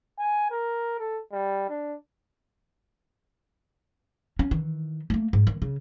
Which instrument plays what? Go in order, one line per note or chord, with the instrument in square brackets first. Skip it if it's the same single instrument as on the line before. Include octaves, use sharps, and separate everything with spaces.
[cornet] G#5
A#4
A4
G3
D4
[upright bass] C#4
D#3 E3
A3 A#3
G#2
D#3
C#3